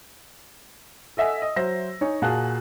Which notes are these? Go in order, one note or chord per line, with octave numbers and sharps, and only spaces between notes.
A4 D#5 E5 F#5 G#5 E6
D#5
F#3 C5 E5 A#6
D#4 C#5 G#5
A#2 F4 F#4 G#4 A5 F#6